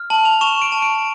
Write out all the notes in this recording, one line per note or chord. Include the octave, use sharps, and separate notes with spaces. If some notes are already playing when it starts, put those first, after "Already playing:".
Already playing: F6
A5 F#7
F7
C#6 E7
D7
A5
D7